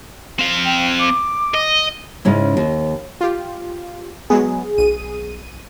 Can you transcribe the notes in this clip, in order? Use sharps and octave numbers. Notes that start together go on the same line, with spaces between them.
C4 F5
G5
D6
D#5
G#2 C#3 C#4 E4
D#2
F4 G4
F#3 G#3 B3 G#4
B1 D#7